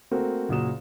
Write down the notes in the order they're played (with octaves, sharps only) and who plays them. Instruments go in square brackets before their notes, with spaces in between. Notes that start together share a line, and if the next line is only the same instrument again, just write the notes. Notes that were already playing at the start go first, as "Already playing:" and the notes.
[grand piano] A3 A#3 C4 F#4 A#4
F#1 A#2 F#4 D#6 E7